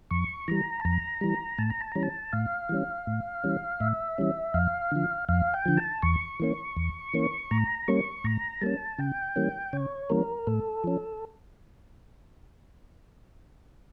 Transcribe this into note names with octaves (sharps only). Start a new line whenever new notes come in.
F2 C#6
E3 G3 A#5
A5
F2 A#5
E3 G3
A2 A5
A#5
A5
E3 G3 C#4 A#5
A5
A2 F5
E3 G3 C#4
A2
E3 G3 C#4
A2 E5
E3 G3 C#4
F2 F5
D3 F3
F2 F5
G5
D3 F3
A5
E2 C#6
E3 A#3 C#4
E2
E3 A#3 C#4
A2 A#5
G3 A#3 C#4 C#6
A2 A#5
G3 A#3 C#4 A5
C#3 G5
E3 G3 A#3 C#4
C#3 C#5
E3 G3 A#3 C#4 A#4
A2 A4
F3 C#4